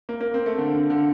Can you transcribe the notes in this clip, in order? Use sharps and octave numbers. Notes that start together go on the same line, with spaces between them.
A#3
A#3
C4
A3
D3
D3
D3